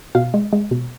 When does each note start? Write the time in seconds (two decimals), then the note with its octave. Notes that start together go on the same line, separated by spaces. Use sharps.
0.15 B2 F5
0.34 G#3
0.53 G#3
0.71 B2